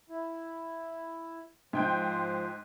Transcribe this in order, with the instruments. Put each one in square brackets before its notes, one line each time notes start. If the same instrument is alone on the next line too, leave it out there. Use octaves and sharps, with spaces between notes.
[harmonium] E4
[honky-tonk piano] G#2 G5 G6 [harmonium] F3 C5